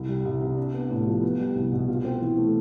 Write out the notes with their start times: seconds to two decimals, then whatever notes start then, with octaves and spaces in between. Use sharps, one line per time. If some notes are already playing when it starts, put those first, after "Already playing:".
Already playing: C2
0.08 G3
0.25 C2
0.41 C3
0.57 D4
0.74 B3
0.90 A2
1.07 F3
1.23 B3
1.39 G3
1.55 C2
1.72 B2
1.88 F4
2.05 C4
2.21 E3
2.37 A3